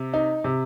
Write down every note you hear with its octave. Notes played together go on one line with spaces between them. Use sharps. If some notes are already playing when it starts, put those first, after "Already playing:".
Already playing: C3
D#4
C3